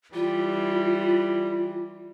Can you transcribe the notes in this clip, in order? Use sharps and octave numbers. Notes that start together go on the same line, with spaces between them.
E3 G3 F4